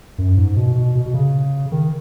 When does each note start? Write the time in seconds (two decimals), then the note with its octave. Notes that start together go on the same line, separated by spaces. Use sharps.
0.18 F#2
0.37 G#2
0.56 B2
0.76 B2
0.95 B2
1.06 B2
1.14 C#3
1.72 D#3